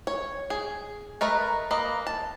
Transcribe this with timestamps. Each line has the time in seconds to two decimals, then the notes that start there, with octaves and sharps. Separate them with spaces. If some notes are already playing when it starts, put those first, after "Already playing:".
0.07 C#5
0.50 G#4
1.21 A3 A#4 B4 D#5
1.71 A#3 B4 D#5
2.07 A5